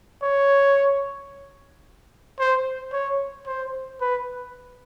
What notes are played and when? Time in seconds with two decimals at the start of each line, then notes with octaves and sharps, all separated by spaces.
0.23 C#5
2.39 C5
2.93 C#5
3.47 C5
4.01 B4